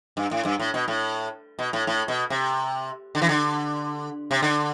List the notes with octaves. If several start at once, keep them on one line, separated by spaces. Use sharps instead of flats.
G2
A2
G2
A2
B2
A2
B2
A2
A2
B2
C3
D3
E3
D3
C3
D3